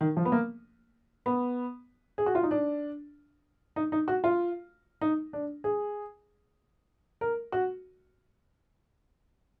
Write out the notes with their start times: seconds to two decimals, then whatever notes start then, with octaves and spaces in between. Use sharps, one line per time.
0.01 D#3
0.17 F3
0.25 B3
0.32 A#3
1.26 B3
2.18 G#4
2.26 F#4
2.35 F4
2.43 D#4
2.51 D4
3.76 D#4
3.92 D#4
4.08 F#4
4.24 F4
5.01 D#4
5.33 D4
5.64 G#4
7.21 A#4
7.52 F#4